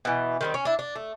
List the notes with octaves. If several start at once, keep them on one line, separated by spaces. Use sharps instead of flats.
B2 E3
D#3 G3 C4
C#4
D4 E4
D4
A3